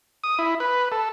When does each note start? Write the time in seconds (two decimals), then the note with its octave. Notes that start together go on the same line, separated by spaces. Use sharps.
0.24 D#6
0.39 E4
0.60 B4
0.92 A4